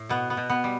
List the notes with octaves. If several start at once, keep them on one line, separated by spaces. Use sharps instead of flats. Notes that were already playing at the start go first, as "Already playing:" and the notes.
Already playing: A2
B2 B3
B3
B2
B3
G3